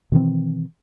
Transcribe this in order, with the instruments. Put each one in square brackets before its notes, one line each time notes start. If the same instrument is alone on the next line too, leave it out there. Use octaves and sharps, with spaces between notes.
[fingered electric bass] B2 D#3 E3 C4